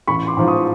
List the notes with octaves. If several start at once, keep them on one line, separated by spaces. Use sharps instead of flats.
A1 B5 C#6
C6 D6
G#2 F3
C#6 D#6